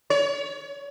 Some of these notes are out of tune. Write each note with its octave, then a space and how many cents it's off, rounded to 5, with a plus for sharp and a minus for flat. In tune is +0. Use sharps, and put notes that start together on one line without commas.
C#5 +30